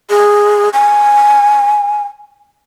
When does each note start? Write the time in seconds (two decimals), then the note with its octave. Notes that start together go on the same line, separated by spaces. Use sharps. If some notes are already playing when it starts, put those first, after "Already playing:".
0.10 G#4
0.73 G#5